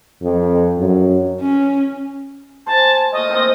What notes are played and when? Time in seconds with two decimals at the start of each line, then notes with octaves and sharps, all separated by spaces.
0.22 F2
0.79 F#2
1.40 C#4
2.67 C5 F#5 G#5 A5
3.12 A#2 A3 D#5
3.28 F3 C4 D#4